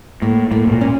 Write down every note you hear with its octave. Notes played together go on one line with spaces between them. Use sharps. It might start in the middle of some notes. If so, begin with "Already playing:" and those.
A2 A#3
A2 A#3
A2
A#2
C#4